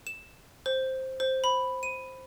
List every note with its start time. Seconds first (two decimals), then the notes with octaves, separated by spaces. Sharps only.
0.07 E7
0.66 C5
1.20 C5
1.44 B5
1.83 D#7